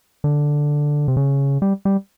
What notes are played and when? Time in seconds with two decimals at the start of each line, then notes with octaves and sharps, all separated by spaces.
0.24 D3
1.08 C3
1.17 C#3
1.62 G3
1.85 G3